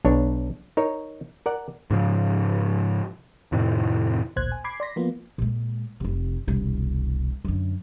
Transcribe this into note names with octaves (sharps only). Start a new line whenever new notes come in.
B1 D4 C#5
D#4 A#4 C#5
A#4 D5 F#5
G#2 C#3 F3
F2 A2 C3 D#3
A1 D2 A#2 C5 F#6 G#6
G#5
B5 D6 G#6 C7
D5 C6 A#6 B6
F3 A#3 B3 F4
A#2 G#3
F1 C3
E1 C2
F#2 D3